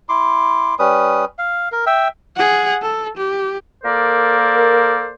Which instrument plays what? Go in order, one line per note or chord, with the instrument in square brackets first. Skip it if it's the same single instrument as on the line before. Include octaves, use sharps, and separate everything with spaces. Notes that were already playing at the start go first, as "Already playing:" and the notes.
[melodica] E4 C6 D6
G3 C#4 B4 D#6
F5
A#4
E5 G5 E6
[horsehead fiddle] G#4 F#5
A4
G4
[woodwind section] A#3 A4 A#4 C5 D5